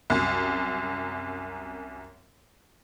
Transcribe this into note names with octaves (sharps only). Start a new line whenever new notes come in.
C2 F#2